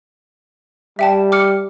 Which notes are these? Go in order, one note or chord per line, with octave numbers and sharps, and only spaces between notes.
G3 E5 G5 A5
D6 F6 C#7